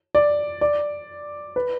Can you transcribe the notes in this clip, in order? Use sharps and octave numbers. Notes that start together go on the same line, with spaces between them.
D5
D5
B4